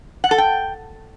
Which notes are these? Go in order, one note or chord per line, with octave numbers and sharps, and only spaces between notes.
F#5
A4
G5